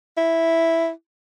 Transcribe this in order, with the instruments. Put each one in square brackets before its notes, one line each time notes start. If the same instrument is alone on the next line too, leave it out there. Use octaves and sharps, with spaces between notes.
[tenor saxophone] E4